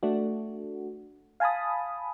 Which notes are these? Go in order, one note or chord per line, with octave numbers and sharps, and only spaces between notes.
A3 D4 F#4
F5 G#5 A5 B5 D#6